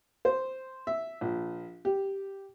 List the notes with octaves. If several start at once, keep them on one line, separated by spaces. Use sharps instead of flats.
C5
E5
A#1
G4